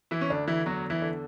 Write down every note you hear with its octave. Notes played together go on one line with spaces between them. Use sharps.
E3 E4
C#4
D2 D4
E3 E4
E2 F#3 F#4
E3 E4
D3